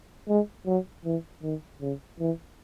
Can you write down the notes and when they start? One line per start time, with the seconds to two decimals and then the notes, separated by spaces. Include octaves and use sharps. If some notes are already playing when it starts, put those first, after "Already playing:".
0.28 G#3
0.66 F#3
1.05 E3
1.43 D#3
1.81 C#3
2.19 E3